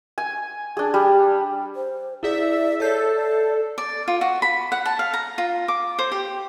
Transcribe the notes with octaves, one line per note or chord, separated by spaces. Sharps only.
G#5
D4 G#4
G3
C5
E4 G#4 D5 E5
A4 C#5 E5 G6 C7
D5
D5
F4
F#4
B5
F#5
A5
F5
A#5
F4
D6
C5
G4